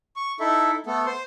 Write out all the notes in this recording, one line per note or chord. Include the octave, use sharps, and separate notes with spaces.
C#6
D#4 E4 A4 E5
A3 B3 A4
C5 C6